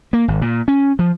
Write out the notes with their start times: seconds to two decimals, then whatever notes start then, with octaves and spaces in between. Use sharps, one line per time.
0.13 A#3
0.28 G#1
0.41 A#2
0.68 C#4
0.99 F3